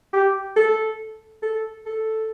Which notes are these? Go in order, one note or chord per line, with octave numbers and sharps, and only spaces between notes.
G4
A4
A4
A4